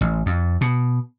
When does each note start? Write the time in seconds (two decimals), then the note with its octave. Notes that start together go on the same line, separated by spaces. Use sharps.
0.01 A1
0.26 F2
0.61 B2